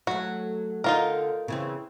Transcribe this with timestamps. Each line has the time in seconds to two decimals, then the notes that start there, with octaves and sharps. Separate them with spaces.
0.07 F#3 A3 F#4
0.84 D3 D#4 F4 A#4
1.48 C#3 E3 C4